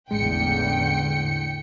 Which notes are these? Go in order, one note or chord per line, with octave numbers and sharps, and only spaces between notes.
A1 E2 A2 D3 G#3 G5 C#7